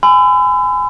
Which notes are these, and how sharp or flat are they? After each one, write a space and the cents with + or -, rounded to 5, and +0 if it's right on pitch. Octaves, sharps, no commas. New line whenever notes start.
G#5 +0 B5 +40 E6 +25